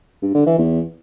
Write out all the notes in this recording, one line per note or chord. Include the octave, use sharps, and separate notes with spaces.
G2
D3
E3
E2